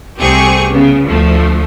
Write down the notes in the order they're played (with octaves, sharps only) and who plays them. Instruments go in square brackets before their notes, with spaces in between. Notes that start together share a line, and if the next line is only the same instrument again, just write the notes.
[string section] C2 A3 C4 G4 G#4 C#6
C#3 B3
D2 F3 A3